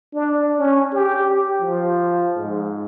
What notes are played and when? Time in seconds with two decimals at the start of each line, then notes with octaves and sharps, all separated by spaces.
0.13 D4
0.59 C#4
0.93 G4
1.61 F3
2.37 G#2